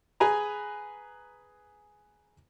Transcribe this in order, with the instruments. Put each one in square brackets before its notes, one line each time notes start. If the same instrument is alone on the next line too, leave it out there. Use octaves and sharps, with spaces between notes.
[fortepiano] G#4 B4 G#5 A#5